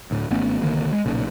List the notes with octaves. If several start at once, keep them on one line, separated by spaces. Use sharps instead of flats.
D2 A2
G#1 A3 B3 C#4
C2 D3 D#3 A#3
G#3
B1 A#2 C#3